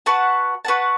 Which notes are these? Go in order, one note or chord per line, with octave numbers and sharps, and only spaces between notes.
F#4 B4 F#5 A5
F#4 B4 F#5 A5